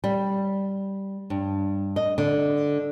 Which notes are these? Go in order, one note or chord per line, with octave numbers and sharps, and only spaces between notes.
G3
G2
D#5
D3